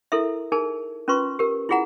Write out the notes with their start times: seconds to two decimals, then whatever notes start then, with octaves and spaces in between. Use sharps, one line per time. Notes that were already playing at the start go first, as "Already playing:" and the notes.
0.12 E4 A4 A#4 E5
0.52 D#4 G#4 A#4 A5
1.08 C#4 F4 B4 C6 C#6
1.39 G4 A#4
1.69 E4 F4 G#4 F#5 A#5